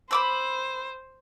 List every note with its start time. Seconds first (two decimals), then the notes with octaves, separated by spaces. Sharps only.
0.11 C5 B5 D6 E6